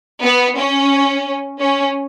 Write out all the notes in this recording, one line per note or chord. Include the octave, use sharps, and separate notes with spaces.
B3
C#4
C#4